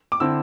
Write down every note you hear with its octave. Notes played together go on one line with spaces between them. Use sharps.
D6
D3 C4 E4 E6